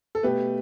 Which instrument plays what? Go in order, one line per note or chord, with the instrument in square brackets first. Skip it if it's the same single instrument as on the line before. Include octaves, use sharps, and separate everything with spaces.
[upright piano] A4
B2 A3 G4 B4